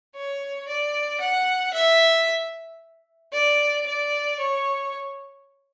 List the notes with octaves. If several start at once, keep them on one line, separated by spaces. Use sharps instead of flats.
C#5
D5
F#5
E5
D5
D5
C#5